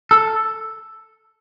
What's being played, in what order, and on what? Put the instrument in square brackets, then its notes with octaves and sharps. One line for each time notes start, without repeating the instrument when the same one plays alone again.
[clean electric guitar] A4